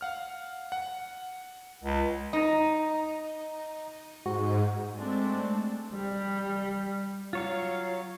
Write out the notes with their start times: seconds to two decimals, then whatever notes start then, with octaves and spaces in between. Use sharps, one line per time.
0.01 F5 F#5 F6
0.72 F#5
1.84 C#2
2.33 D#4 D#5 A#5
4.26 G#2 F#4
4.94 G#3 A3 C4 D4
5.94 G3
7.33 F#3 F4 C#5 F5